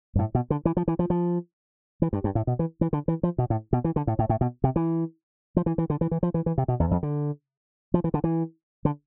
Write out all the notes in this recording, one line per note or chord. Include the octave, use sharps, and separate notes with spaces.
G2
A2
B2
D3
E3
F3
E3
F3
F3
E3
G2
G2
A2
B2
E3
E3
D3
E3
F3
B2
A2
B2
E3
D3
A2
A2
A2
B2
C3
E3
F3
E3
E3
D3
E3
E3
F3
E3
E3
C3
B2
E2
F2
D3
F3
E3
D3
E3
D3